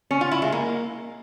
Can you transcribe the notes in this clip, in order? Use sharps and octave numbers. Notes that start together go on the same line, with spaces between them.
C#4
F4
E4
G#3
A#3